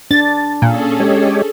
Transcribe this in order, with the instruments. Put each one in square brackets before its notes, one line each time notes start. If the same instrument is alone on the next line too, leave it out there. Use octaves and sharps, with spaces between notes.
[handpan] D4 [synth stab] A6
[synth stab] A#2 [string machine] C#4 G#4 A4
[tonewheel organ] G#3 G4 C#5